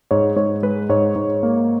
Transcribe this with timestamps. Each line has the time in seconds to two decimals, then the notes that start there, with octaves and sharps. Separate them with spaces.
0.11 G#2 C#5
0.36 G#2 C#5
0.63 G#3 B4
0.89 G#2 C#5
1.16 G#2
1.43 A#3